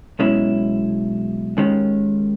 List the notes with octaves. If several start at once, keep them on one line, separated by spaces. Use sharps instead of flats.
B1 B2 G#3 C#4 E4
D#2 D#3 G#3 C#4